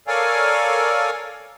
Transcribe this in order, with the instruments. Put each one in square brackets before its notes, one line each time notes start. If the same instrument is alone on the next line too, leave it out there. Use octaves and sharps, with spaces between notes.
[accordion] A4 A#4 C#5 D5 F5 G#5